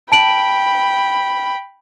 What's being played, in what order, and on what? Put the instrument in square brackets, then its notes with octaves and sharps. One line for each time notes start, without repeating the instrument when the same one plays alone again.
[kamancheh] G5 B5 [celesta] A5 D7 F#7